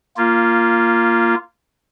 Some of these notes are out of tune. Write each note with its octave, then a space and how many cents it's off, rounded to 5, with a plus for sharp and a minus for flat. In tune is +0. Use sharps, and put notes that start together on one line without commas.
A#3 +0 F4 -15